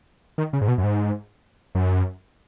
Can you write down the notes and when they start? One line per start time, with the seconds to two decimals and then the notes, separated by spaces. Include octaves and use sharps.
0.38 D#3
0.53 C#3
0.61 G#2
0.68 B2
0.78 F#2
0.84 G#2
1.75 F#2